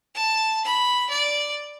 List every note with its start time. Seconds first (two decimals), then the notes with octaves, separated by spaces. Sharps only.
0.14 A5
0.65 B5
1.10 D5